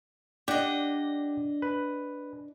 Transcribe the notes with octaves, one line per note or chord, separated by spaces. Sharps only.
D4 G4 D#5 F#5
B4